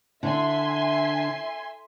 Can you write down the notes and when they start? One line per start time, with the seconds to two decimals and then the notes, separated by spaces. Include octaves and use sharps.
0.23 D3 E5 G#5 C6